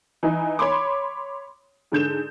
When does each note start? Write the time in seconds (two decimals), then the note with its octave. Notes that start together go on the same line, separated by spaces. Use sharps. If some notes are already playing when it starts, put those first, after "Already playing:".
0.23 E3 D#4
0.59 C#5 B5 C6 D6
1.92 G#2 D3 G6 E7